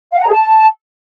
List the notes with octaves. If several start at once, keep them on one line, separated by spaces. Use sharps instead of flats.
F5
F#5
A#5
G#4
A5